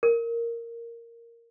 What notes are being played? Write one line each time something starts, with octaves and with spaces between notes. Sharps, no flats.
A#4